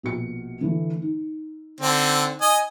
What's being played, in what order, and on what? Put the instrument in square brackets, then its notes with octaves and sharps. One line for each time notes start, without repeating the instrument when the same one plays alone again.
[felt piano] A#1 B2 C#7
D3 E3 A3
D#4
[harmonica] D3 C4
D#5 G#5